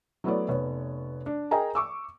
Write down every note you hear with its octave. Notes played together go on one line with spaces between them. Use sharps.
F#3 A3 B3 E4 C#5 D5
F1 B3 C#5
D4
G#4 A#4 D#5 G5 G#5 A#5
C#6 D6 E6